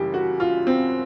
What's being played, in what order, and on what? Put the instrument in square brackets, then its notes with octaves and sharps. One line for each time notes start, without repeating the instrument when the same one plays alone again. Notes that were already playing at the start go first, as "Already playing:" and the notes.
Already playing: [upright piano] F#2 C#3 E3 G3 [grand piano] G4
[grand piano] F#4
F4
C4